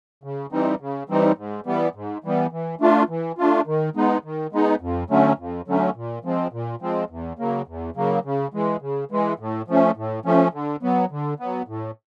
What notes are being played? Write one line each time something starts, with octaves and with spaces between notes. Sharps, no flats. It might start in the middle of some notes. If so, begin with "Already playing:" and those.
C#3
E3 G3 C4 D#4
C#3
E3 G3 C4 D#4
G#2
E3 G3 B3
G#2
E3 G3 B3
E3
A3 D4 F4
E3
A3 D4 F4
D#3
G#3 B3 D#4
D#3
G#3 B3 D#4
F2
D3 F#3 A3 C#4
F2
D3 F#3 A3 C#4
A#2
F3 G#3 C4
A#2
F3 G#3 C4
E2
C#3 F#3 A#3
E2
C#3 F#3 A#3
C#3
E3 G#3
C#3
E3 G#3
A2
F3 A3 C#4
A2
F3 A3 C#4
D3
F#3 B3
D3
F#3 B3
A2